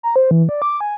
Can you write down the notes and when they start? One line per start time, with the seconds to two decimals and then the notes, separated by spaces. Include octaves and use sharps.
0.03 A#5
0.16 C5
0.31 E3
0.49 D5
0.62 D6
0.81 G#5